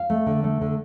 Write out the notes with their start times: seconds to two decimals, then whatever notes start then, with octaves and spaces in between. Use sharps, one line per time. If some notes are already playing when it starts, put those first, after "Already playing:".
Already playing: F5
0.10 A3
0.26 D3
0.44 A3
0.61 D3